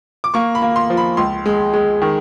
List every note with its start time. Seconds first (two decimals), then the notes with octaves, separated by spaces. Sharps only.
0.24 D6
0.34 A#3 C#6
0.55 B5
0.62 A#3
0.76 C6
0.90 F3
0.97 B5
1.17 C#2 C6
1.46 G#3
1.74 G#3
2.02 D#3